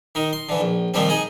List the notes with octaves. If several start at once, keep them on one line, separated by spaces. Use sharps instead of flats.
D#3 D#4
C6
D3 E3
A#1
A#2 D#3 F3 G3 C4
D#4 G#4 D#5